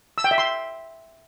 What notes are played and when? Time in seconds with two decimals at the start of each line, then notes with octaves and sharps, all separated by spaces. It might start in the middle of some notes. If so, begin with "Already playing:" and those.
0.18 E6
0.24 G5
0.31 E5
0.38 C6